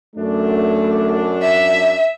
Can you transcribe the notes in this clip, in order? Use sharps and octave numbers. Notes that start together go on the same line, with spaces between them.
F#2 A3 D4
E5